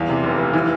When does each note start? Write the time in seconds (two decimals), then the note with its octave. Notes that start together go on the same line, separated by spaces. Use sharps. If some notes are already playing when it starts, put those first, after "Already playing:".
Already playing: E2 F5
0.09 C3
0.24 F1
0.39 F1
0.53 E3